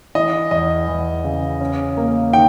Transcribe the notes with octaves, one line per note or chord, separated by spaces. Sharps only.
E3 D#5
E2 D#5
E2
C#3
C#4
A#3
D#3 G5